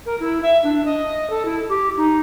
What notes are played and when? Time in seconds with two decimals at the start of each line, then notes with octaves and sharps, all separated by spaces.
0.05 A#4
0.19 E4
0.42 E5
0.63 D4
0.85 D#5
1.29 A4
1.45 E4
1.68 G4
1.96 D#4